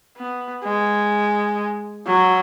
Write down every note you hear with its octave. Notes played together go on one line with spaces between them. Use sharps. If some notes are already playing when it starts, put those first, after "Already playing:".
B3
G#3
F#3